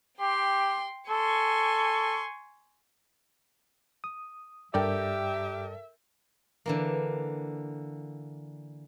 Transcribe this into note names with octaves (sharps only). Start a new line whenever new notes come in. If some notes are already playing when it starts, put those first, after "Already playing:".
G4 G5 C6
A4 G#5 C6 C#6
D#6
G2 G4 A4 A#4 D5 E5 G5
D3 E3 A#3